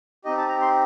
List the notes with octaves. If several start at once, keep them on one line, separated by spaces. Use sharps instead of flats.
C4 D#4 G4 D#5
A5
A#5
C6